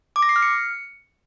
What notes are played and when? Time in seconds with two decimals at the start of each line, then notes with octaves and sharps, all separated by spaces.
0.16 D6
0.22 A#6
0.29 C7
0.36 F6
0.42 C#7